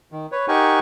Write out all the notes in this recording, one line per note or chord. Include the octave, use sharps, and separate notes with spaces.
D#3
B4 C#5
D#4 G4 A#4 F#5 G#5 C#6